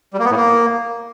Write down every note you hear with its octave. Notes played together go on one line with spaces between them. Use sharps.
G3
A#3
B3
A2
A#3